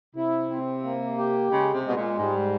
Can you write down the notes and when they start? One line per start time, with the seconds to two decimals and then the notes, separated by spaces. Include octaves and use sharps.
0.16 C3 E4
0.51 C4
0.84 A#3
1.18 G4
1.51 C#3 G#3
1.74 C3
1.85 B2 G#3
1.96 A#2
2.18 G#2 G3